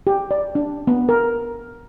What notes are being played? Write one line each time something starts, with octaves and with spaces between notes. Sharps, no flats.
G4
D5
D4
B3
A#4